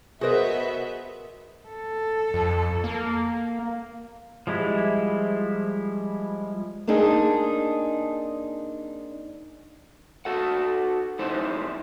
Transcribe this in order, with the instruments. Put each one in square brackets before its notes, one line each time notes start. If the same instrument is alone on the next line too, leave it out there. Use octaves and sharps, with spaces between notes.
[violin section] B3 E5 [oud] F#4 A#4 [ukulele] G#4 C5 D#5
[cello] A4
[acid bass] F2
A#3
[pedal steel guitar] F3 G3 G#3 E4
[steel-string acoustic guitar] A#3 C4 D4 D#4 G#4
[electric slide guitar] F#4 A4 F#5
D#4 E4 G4 C5